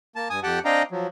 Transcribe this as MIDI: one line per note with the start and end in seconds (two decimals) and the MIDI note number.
0.16 0.28 58
0.16 0.28 81
0.30 0.40 43
0.30 0.40 80
0.30 0.40 87
0.43 0.59 41
0.43 0.59 67
0.43 0.59 78
0.43 0.59 79
0.43 0.59 81
0.65 0.83 60
0.65 0.83 62
0.65 0.83 75
0.65 0.83 77
0.65 0.83 79
0.65 0.83 82
0.91 1.07 53
0.91 1.07 54